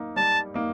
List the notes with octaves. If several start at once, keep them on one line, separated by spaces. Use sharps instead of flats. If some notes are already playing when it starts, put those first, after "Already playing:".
Already playing: A#3 D#4
G3 A5
A#3 D#4